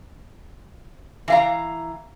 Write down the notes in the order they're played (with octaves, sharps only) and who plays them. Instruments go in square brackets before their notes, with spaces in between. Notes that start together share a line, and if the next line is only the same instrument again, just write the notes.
[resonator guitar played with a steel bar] E3 F5 A#5